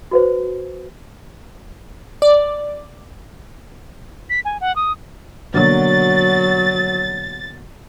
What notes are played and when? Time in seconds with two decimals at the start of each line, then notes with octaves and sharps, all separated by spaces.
0.11 F#4 B4 C5
2.22 D5
4.30 B6
4.45 G#5
4.60 F#5
4.76 D#6
5.54 B2 D3 F#3 A#3 A6